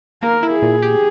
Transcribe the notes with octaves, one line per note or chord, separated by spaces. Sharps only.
A#3 A#4
E4
G#4
A#2
G4